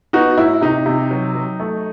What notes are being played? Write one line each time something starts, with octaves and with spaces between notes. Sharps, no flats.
B3 D#4 F#4
A2 E4
C3 D#4
C3
F#3
F#3
A3